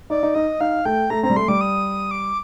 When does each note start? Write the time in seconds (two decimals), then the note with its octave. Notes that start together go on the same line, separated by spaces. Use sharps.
0.10 D#4 D5
0.23 D#4
0.35 D#4 D#5
0.60 D#4 F5
0.85 A3 G5
1.10 A3 A#5
1.23 C4 A#5
1.30 G3
1.36 A3 C6
1.48 G3 D6
1.61 D#6
2.11 D6